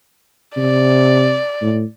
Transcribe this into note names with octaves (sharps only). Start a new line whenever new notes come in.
C3 D5
A2